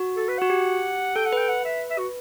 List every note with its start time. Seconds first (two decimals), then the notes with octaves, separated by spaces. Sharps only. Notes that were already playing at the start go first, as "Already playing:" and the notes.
Already playing: F#4
0.17 A4
0.28 B4
0.38 F#4 F#5
0.50 G4
1.16 A4 G5
1.26 F#5
1.33 B4 G5
1.49 F#5
1.65 E5
1.90 E5
1.98 F#4